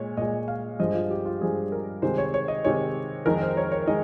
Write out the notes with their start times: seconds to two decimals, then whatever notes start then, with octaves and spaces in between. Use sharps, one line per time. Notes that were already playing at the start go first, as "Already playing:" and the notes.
Already playing: A#2 G#3 C#5
0.17 A#2 G#3 D#5
0.48 F5
0.79 G2 F3 G#3 D#5
0.94 F4
1.10 G4
1.25 F4
1.41 G2 F3 G#3 G#4
1.72 A#4
2.02 C3 D#3 G#3 C5
2.18 C#5
2.34 C#5
2.48 D#5
2.64 C3 D#3 G#3 C#5
3.26 F2 D#3 G#3 A#4
3.41 C5
3.57 C#5
3.72 C#5
3.87 D#3 G#3 D#5